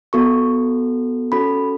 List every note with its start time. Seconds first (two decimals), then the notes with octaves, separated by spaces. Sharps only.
0.13 B3 F#4 A4 C#6
1.32 C#4 F#4 A4 B5